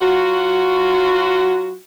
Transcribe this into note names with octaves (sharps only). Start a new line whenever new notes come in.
F#3 F4 F#4